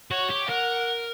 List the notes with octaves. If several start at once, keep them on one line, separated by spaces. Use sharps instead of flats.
F#4 C#5
G4
A#4 F#5